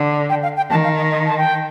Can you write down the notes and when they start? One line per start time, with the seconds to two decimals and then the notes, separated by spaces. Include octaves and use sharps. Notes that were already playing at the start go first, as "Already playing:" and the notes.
Already playing: D3
0.30 G5
0.43 F5
0.57 G5
0.70 D#3 A5
0.84 F5
0.97 D#5
1.11 D#5
1.26 A5
1.38 G5